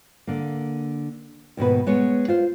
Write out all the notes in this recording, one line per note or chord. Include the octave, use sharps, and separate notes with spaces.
D3 A#3
D#2 G#2 B2 B4
G#3 B3 C#5
F4 C5